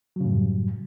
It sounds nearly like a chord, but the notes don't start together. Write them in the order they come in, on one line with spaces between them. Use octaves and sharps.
F#3 C#3 A2 F#2 G3